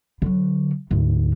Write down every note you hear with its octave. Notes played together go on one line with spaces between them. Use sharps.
D3 F#3
D2 G#2